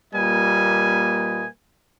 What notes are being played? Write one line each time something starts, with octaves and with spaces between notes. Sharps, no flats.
A#2 G3 A#3 B4 D#5 G#5